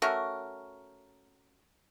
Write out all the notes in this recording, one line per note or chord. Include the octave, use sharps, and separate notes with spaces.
A3 C#4 F#4 A#4